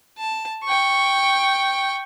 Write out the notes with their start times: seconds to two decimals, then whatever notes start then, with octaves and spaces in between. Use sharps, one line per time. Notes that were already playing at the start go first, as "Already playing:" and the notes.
0.18 A5
0.64 G5 C#6